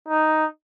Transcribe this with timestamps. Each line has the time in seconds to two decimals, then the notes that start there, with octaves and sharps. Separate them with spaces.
0.08 D#4